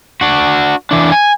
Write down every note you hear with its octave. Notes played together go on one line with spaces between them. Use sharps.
D4 F#4
E3 D4
G#5